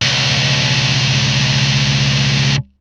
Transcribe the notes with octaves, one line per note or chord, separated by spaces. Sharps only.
C#2 B2